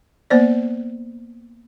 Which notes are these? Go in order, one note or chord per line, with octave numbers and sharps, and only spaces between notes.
A#3 B3 C5 D5